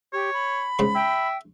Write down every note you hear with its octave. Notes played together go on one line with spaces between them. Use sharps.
G4 C#5
B5
G#2 C#3 C6
E5 G5